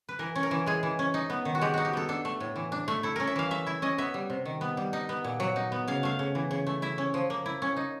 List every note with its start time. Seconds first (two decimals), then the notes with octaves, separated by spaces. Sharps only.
0.09 B4
0.19 E3 A#4
0.35 C#4
0.43 A#4
0.51 E3
0.66 G#3 G#4
0.83 E3
0.99 C#4
1.14 D#4
1.30 B3
1.45 D#3
1.55 F#4
1.61 G#3 G4
1.74 D#4 F#4
1.85 G4
1.93 B3 A4
2.09 D4 A4
2.25 A3
2.40 A2
2.56 E3
2.72 D4
2.88 A3
3.03 E4 A4
3.16 C#4 A#4
3.27 E5
3.36 E3 F5
3.51 A3 E5
3.66 E4 E5
3.82 C#4 D#5
3.98 B3 E5
4.14 G3
4.30 C3
4.45 D#3
4.61 B3
4.77 G3
4.93 D#4
5.09 B3
5.24 A#2
5.40 F#3
5.56 D#4
5.72 B3
5.88 C#3 F5
6.03 A3 F5
6.19 C#3
6.35 E3
6.51 C#3
6.67 A3
6.82 E4 E5
6.98 C#4
7.14 F3
7.30 A#3
7.46 E4
7.62 C#4
7.77 D#4